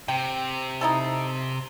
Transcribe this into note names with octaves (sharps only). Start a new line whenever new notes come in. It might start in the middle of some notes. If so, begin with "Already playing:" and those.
C3 G5
D#4 E4 A4